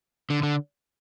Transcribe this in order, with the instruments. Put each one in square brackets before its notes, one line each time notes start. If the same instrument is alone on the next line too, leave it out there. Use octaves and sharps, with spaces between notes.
[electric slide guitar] D3
D3